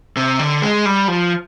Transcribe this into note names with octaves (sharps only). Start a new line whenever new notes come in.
C3
D3
G#3
G3
F3